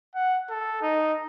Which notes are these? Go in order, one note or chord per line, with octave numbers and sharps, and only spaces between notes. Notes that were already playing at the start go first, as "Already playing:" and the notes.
F#5
A4
D#4